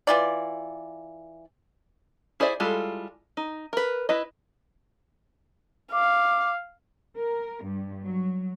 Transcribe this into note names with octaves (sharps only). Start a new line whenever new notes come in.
E3 F4 D5
E4 G#4 C5 D5 E5
G3 G#3 E4 F4 A4
D#4
A#4 B4
E4 B4 D#5
F5 D6
A#4
G2
F#3